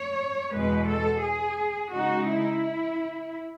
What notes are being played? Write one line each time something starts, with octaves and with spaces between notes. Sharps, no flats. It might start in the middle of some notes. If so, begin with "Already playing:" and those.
Already playing: C#5
E2 B2 G#3 B4
A4
G#4
C#3 G#3 D#4 F#4
E4